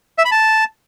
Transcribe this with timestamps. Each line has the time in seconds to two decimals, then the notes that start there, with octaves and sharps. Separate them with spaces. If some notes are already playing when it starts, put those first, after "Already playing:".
0.18 E5
0.25 B5
0.32 A5